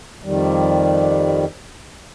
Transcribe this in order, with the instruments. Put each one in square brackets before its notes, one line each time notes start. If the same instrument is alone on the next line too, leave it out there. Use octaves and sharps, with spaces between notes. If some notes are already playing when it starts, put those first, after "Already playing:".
[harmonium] F2 D#3 G3